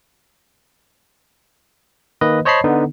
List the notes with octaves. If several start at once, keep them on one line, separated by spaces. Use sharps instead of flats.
D#3 A#3 B4 D#5
C5 C#5 D#5 A5 B5 C7
D3 B3 D#4